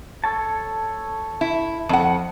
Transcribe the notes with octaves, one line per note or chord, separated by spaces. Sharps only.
A4 C#5 A5
E4
F2 F#5